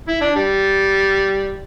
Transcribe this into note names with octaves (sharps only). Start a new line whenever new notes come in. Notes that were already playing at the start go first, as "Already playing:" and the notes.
E4
D4
G3